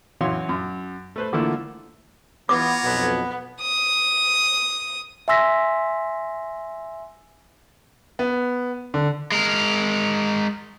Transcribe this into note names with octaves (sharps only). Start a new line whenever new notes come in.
F#2 E3 F#4 C#5 F5 C6
F#2
A3 B4 C5
D3 E3 A3 A#3 E4 F4
E3 B3 F4 C#5 A#5 D6
B1 F2 B2 B3
D#6
E5 G#5 C6 E6 A#6 B6
B3
D3
G#3 A#4